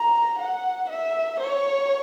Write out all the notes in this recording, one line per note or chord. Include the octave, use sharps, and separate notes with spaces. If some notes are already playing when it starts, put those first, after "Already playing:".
Already playing: A#5
F#5
E5
C#5